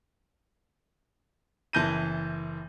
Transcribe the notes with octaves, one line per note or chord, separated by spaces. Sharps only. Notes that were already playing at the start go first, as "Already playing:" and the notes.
F#1 E3 A5 G6 A#6 D#7